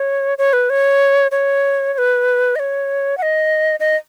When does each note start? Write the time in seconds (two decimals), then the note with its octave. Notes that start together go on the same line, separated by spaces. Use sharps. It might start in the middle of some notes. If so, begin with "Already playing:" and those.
Already playing: C#5
0.38 C#5
0.53 B4
0.70 C#5
1.31 C#5
1.93 C#5
1.98 B4
2.56 D#5
2.59 C#5
3.18 F#5
3.22 D#5
3.80 D#5